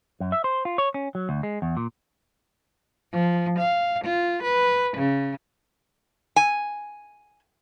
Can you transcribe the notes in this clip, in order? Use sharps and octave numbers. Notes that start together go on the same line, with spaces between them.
F#2
E5
C5
F4
C#5
C#4
F#3
D2
G#3
E2
A#2
F3
F5
F4
B4
C#3
G#5